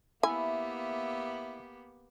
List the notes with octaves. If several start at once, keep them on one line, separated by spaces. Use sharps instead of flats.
A#3 B3 E4 G4 E5 G#5